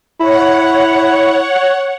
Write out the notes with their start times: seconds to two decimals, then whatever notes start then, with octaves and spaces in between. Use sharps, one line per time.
0.21 E4 C#5 F#5